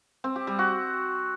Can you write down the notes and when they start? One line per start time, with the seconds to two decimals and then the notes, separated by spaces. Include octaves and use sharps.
0.24 C4
0.36 G4
0.47 G3
0.59 F#4